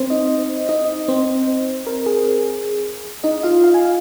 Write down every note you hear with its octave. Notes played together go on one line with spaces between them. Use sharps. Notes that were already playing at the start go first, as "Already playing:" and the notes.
Already playing: C4 C5
D#4 D#5
D#4 D#5
C4 C5
A#4
G#4
D#4 D#5
F4 F5
F5
G#5
F5